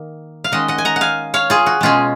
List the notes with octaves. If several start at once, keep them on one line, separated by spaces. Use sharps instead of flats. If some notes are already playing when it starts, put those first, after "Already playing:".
Already playing: D#3 A#3
F5
D#3 G#3 C#4 D#5 F#5
D#5 F#5
G#5
F#5 A#5
F#5
F5 G#5
C#5 F5
F4 G#4
F#4
B2 G#3 C#4 F4 G#4